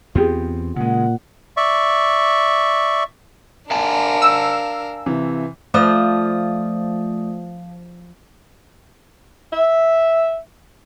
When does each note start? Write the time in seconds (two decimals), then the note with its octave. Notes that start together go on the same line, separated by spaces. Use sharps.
0.15 E2 B3 C4 F4 G4 G#4
0.76 A#2 C#3 G#3 F#5
1.57 D5 E5 C#6
3.71 D4 A#4 F5 G#5 A5
4.22 E6
5.06 C3 E3
5.74 F3 A3 D5 D#6
9.52 E5